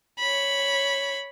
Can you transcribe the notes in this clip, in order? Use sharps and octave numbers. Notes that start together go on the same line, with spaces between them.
C#5 B5